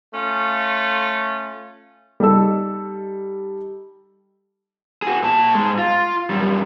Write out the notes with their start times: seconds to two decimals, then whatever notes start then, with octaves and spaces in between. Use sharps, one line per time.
0.14 A3 C#4 F4
2.20 G3 D#4 A4 E6
5.02 F#4 G#4
5.23 A#2 A5
5.55 G#2 G#3
5.78 F4
6.30 F#2 G3